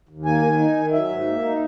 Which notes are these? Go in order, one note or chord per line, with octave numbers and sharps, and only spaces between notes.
D#2
A#3 G#5
D#3
D#4
D#3
F#3 E5
G#2
A#3
D#4